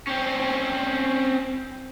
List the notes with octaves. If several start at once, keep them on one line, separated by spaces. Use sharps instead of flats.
C4 C#4